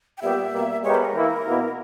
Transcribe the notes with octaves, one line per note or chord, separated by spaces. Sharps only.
G5
A#2 G3 B3 G4 E5
B2 G3 A#3
G#3 B3 G4 A#4 C#5
B4
A#4
E3 A#3 E4
B2 A#3 E4